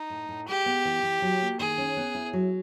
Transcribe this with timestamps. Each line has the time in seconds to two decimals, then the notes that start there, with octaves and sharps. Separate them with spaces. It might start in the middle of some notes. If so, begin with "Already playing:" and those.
Already playing: D#4
0.10 A2
0.29 A2
0.48 G#3 G4
0.66 B3
0.85 E3
1.03 E3
1.22 F#3
1.41 A#3
1.60 D#3 G#4
1.78 C#4
1.97 B3
2.15 E4
2.33 F#3